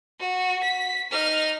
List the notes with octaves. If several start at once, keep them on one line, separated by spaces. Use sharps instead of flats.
F#4
B6
D#4 F6